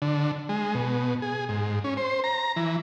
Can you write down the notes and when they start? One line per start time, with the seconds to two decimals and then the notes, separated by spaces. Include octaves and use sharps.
0.02 D3
0.49 G#3
0.75 B2
1.22 G#4
1.49 G#2
1.84 C#4
1.97 C5
2.24 A#5
2.56 E3